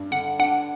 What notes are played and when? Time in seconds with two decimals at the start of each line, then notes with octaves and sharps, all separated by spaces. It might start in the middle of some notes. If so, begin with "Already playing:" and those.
Already playing: G2
0.11 D3 F#5
0.39 D4 F#5